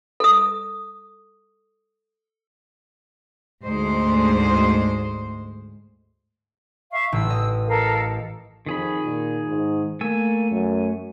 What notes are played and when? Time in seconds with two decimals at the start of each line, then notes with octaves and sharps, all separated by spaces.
0.20 A4 D#6
3.63 D2 G#2 G#3 C5
6.92 E5 F5 C#6
7.12 A1 E6
7.30 D#5
7.67 A4 A#4 F5
8.66 F2 D#3 G#4 B5
9.04 A#2
9.48 G#2
10.01 A3 A#3 G#5 E6
10.51 F#2